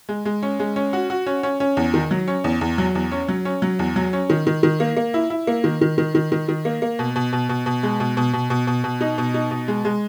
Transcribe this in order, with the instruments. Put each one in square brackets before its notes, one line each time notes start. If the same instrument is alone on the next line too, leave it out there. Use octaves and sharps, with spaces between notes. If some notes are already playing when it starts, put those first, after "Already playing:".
[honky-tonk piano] G#3
G#3
C#4
G#3
C#4
F#4
F#4
C#4
C#4
C#4
E2
D#3
F#3
C#4
E2
E2
F#3
E2
C#4
F#3
C#4
F#3
E2
F#3
C#4
D#3
D#3
D#3
A#3
A#3
E4
E4
A#3
D#3
D#3
D#3
D#3
D#3
D#3
A#3
A#3
B2
B2
B2
B2
B2
G#3
B2
B2
B2
B2
B2
B2
D#4
B2
D#4
B2
G#3
G#3